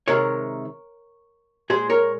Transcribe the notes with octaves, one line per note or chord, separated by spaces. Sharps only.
C3 D#3 G#3 A#4 C#5
A#2 G#3 G#4 C5
A#4 C#5